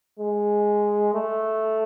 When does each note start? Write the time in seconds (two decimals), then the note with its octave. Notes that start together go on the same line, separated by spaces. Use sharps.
0.19 G#3
1.14 A3